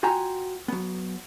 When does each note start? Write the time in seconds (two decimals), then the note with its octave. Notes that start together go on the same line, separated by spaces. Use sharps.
0.03 F4 F#4 G5 G#5 A#5
0.68 F#3 B3